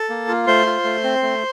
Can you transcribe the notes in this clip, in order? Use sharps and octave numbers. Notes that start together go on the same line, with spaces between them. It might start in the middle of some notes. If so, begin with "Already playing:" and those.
Already playing: A4 A5
A#3
F4
A3 C5 C6
F4
A3
C4
A3